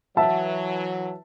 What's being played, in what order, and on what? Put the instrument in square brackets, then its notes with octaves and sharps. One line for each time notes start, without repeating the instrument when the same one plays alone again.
[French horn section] E3 F#3 [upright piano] E5 F#5 A5